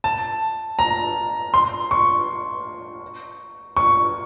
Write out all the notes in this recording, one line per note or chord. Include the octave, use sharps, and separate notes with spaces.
A5
A#5
C6
C#6
C#6